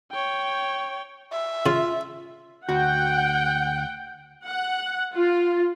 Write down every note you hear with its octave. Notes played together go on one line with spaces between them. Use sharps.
C#5 G5
E5
C#3 F4
D2 F#4 F#5 G5
F#5
F4